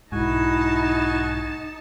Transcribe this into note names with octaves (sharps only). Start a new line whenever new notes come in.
B1 G#2 D#4 E4 F#4 G#5 A5